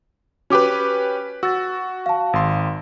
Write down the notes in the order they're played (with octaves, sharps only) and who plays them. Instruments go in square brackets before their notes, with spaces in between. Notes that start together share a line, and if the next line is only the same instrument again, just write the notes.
[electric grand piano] C#4 G4 B4 [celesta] F#4 D6
[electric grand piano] F#4 [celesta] E6 A6
[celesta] F5 A5
[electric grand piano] G#1 C6